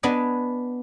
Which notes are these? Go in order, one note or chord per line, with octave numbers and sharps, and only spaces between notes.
B3 D4 D#5 G#5